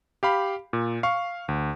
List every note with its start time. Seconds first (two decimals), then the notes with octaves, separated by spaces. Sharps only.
0.23 G4 F5 B5
0.73 A#2
1.03 F5 C#6
1.48 D2